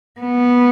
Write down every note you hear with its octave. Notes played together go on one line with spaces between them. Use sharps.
B3